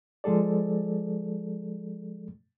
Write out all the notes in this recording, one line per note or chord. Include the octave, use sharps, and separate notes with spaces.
F3 G#3 G#4 A4 D5